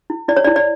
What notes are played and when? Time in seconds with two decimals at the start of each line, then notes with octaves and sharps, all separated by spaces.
0.10 E4
0.28 E4 D5
0.37 C#5
0.45 D5
0.47 E4
0.56 D5